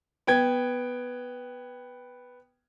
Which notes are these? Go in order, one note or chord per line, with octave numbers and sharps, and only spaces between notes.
B3 G5 G#6